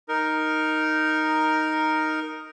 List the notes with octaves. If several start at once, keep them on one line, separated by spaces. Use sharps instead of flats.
D#4 A#4